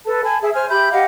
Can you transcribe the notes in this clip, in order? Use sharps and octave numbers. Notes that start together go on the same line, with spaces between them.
A4 B4 A5
G#5 A5 B5
G#4 E5
C5 G#5 F6
G4 E5 B5 G6
G4 D#5 F5 F#5